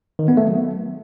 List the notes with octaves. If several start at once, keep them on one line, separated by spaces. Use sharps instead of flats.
D#3
B3
A3
F#3